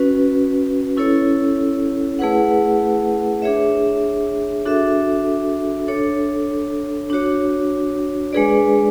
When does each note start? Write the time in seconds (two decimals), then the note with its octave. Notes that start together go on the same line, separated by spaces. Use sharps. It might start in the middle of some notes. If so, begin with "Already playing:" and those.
Already playing: C#4 F#4 B4
0.97 C#4 E4 A4 C#5
2.19 A3 E4 G#4 B4 F#5
3.42 D4 G#4 C#5 E5
4.65 D4 F#4 A4 E5
5.88 D4 A4 C#5
7.10 D4 F#4 C#5
8.33 G#3 D4 G#4 B4 D5